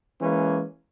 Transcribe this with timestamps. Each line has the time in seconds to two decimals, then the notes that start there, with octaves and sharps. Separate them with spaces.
0.21 E3 G#3 A#3 C#4